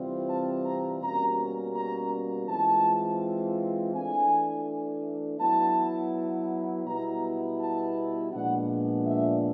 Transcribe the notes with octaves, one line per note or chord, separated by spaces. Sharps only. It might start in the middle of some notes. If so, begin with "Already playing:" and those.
Already playing: C3 E3 G3 C4 F4
A5
A#5
B2 G3 A#3 C#4 A#5
A#5
E3 G#3 C4 F4 A5
E3 A3 D4 G#5
F#3 B3 E4 A5
B2 G3 B3 E4 A#5
A5
A#2 F3 G#3 B3 D4 F#5
E5